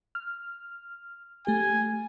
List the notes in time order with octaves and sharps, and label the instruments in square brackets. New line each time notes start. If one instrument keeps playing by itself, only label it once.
[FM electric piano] F6
[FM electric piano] A3 G4 [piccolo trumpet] G#5